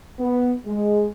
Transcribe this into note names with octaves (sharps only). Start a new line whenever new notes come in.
B3
G#3